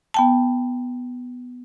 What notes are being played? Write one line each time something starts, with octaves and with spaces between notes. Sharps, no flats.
B3 G5 A5